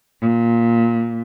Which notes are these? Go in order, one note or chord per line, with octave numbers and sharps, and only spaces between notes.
A#2